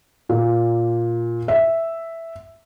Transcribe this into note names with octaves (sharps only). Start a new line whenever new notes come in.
A#2
E5